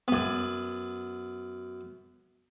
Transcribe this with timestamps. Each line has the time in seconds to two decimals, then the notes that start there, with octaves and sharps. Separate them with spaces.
0.08 F#2 B3